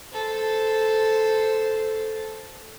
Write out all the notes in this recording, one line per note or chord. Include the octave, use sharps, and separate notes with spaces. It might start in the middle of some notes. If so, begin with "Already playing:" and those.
A4 C5